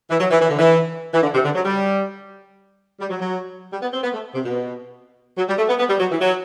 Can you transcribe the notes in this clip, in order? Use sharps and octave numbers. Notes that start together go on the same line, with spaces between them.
E3
F#3
E3
E3
D3
E3
E3
D3
C3
D3
F#3
G3
G3
F#3
F#3
G3
B3
C4
B3
A3
C3
B2
F#3
G3
A3
B3
B3
G3
F#3
E3
F#3